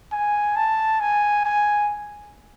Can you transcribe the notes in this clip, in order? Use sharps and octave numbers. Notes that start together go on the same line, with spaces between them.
G#5
A5
G#5
G#5